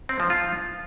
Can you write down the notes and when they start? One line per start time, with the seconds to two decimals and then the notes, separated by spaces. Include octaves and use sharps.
0.09 C4
0.20 F3
0.30 F4